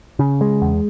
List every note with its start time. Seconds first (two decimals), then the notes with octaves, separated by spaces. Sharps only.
0.19 C#3
0.41 G#3
0.62 E2